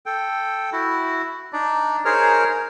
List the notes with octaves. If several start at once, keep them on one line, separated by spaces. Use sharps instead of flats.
A4 G5
E4 F#4
D4 D#4 D5
D#4 G#4 A#4 C5 C#5 F6